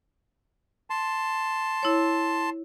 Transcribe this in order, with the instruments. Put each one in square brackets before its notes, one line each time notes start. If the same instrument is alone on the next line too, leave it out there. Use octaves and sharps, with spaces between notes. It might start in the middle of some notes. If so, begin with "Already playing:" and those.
[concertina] A5 C6
[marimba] E4 C#5